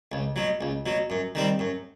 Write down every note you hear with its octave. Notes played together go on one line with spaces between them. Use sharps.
C#2
B2 F#3
C#2
B2 F#3
F#2
D#3 G3 C4
F#2